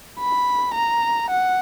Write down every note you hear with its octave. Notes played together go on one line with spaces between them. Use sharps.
B5
A#5
F#5